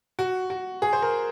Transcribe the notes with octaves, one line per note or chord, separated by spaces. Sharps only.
F#4
F#4
G#4
C5
A#4